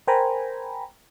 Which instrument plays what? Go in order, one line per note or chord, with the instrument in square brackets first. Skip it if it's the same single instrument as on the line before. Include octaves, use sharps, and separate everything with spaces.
[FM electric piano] A#4 C5 G5 G#5 A#5 B5